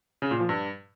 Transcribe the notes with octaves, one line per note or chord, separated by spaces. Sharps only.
C#3
A#2
F3
G2